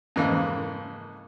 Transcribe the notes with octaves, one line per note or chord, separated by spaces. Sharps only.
F2 G#2 C#3 E3 A#3